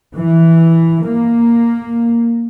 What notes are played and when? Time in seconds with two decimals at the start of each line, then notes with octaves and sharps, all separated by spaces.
0.16 E3
1.06 A#3